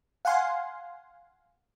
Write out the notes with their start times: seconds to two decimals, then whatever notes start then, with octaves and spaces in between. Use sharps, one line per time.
0.25 F5 F#5 G#5 C6